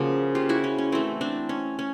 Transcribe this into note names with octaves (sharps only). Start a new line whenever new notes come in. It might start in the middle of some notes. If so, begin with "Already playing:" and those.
Already playing: C#3 F3 A#3 F#4
F4 G4
E4 F#4
C#4
C#4
E3 A3 C4
C4 D4
C#4
C#4